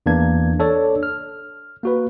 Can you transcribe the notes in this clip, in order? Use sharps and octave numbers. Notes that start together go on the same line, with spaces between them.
E2 E3 A#3 D4 G#6
D4 A4 C#5 D5
F6
A#3 F#4 B4